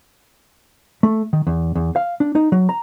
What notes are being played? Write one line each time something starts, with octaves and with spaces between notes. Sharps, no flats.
A3
D#3
E2
E2
F5
D4
D#4
F#3
A#5